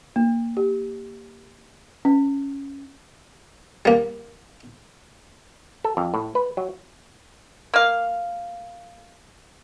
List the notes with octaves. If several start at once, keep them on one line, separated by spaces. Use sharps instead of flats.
A#3
G4
C#4
G3 A#3
A4
F2
A2
B4
F#3
A#3 F5